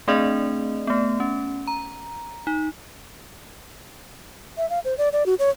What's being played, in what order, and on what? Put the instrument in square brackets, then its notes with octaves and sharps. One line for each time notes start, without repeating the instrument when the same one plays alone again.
[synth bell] A3 C4 D4 G#4 D5 D#5
A3 B3
C#4
A#5
D#4
[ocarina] E5
F5
C5
D5
D5
F#4
C#5